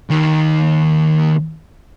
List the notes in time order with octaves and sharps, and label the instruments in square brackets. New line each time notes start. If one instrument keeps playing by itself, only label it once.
[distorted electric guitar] D#2 D#3